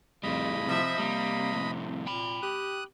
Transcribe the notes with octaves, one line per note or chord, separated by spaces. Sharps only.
F2 A2 C#3 G3 D#5 B5
C3 F3 E5
C3 G3 A#3
F2 A2
A#2 G5 B5
G4 D#6 F#6